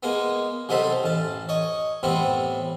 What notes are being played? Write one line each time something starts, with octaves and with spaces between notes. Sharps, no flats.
G#3 A#3 B3
C2 F#3 D#4 A4 C5 B5
A1 A5
C#5 D#5
A2 E3 G3 B3 C4